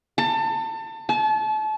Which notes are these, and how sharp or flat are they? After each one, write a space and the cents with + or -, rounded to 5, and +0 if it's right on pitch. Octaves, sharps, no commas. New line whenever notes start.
A5 +30
A5 -35